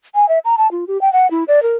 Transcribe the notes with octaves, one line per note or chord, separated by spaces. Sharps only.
G#5
E5
A#5
A5
F4
G4
G5
F#5
E4
D5
A#4